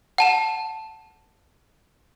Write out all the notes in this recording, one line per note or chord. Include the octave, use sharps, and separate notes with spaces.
F#5 A5 E7